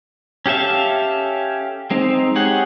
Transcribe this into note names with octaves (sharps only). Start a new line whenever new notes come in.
C#4 G4 A4 E5 F5
G#3 C4 D#4
G4 G#4 C#5 F#5